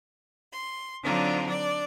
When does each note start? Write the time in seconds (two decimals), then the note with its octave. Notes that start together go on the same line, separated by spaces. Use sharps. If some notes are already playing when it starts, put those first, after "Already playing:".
0.51 C6
1.03 D3 F#3 C4 D4 D#4 F4
1.46 D4 D5